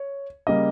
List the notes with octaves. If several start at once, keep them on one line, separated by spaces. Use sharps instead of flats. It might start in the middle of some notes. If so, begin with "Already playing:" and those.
Already playing: C#5
C#3 G3 A#3 D#5